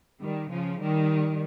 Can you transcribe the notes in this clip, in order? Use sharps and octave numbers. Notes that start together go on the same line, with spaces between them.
D#3 G3
C#3 F3
D#3 G3